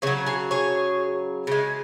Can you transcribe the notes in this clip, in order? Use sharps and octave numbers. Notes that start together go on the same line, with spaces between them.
C#3 F#3 G#4 C#5
G#4 C#5
G#4 C#5
C#3 G#3